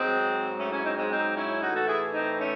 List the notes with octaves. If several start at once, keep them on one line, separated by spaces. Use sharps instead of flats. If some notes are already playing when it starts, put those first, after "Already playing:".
Already playing: G#2 F#3 G#3 C4
A3 C#4
C#4 E4
C4 D#4
G#3 C4
C4 D#4
C#4 E4
A2 E3 D#4 F#4
F#4 A4
E4 G#4
C4 D#4
A3 C#4